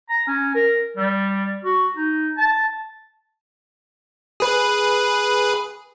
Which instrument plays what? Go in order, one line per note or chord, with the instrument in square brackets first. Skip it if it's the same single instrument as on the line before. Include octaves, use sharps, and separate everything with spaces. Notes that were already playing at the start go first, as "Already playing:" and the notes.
[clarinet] A#5
C#4
A#4
G3
F#4
D#4
A5
[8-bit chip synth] G#4 B4